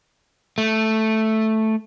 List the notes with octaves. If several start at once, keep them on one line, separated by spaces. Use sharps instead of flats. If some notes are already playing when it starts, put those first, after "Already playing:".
A3